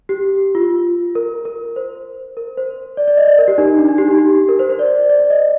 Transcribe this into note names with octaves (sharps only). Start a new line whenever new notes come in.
G4
F4
A#4
A#4
C5
A#4
C5
D5
D5
D#5
D5
A#4
G4
D#4
D4
D#4
G4
D#4
G4
A#4
C5
C5
D5
D5
D5
D#5
D5